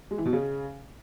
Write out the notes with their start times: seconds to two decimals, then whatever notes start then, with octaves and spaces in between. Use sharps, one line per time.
0.11 G#3
0.18 E3
0.25 B2
0.33 C#3